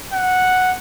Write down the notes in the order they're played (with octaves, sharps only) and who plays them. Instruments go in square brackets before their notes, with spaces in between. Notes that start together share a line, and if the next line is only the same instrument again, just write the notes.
[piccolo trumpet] F#5